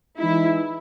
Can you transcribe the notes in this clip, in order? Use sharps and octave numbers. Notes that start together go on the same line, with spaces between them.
E3 G#3 D#4 E4